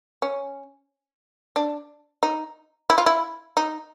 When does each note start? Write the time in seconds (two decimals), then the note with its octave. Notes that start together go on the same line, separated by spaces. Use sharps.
0.22 C#4
1.56 D4
2.23 D#4
2.90 E4
2.98 F4
3.06 E4
3.57 D#4